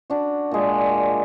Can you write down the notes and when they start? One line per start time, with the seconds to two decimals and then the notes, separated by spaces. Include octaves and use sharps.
0.10 D4 F#4
0.51 A#2 G#3